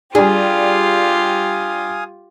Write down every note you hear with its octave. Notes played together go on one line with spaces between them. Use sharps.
G3 D4 F4 G4 G#4 F5 G#5 D#6